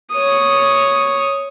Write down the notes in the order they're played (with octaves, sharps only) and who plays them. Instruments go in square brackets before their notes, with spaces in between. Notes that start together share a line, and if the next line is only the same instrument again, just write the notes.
[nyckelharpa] C#5 D#6